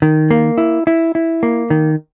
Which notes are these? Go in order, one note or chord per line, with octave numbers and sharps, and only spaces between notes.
D#3
A#3
E4
E4
E4
A#3
D#3